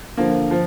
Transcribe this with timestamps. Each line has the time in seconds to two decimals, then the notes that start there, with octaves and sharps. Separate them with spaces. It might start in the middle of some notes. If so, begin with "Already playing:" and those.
0.17 D3 F3 A#3
0.51 F3